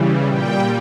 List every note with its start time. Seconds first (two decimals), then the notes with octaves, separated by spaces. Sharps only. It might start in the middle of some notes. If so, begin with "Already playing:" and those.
Already playing: C#3 E3 G3
0.28 A#2 G3 G5